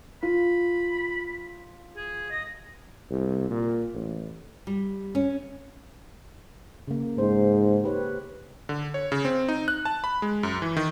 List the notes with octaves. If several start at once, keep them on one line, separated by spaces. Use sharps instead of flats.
F4 B5
G#4
D#5
C2
A#2
A1
G3
C#4
C#3 A#3
G#2 C5
G4 B4 C#5
D3
C#5
C#3
C4
D#4
F#6
A5
B5
G#3
F#2
E3
D#3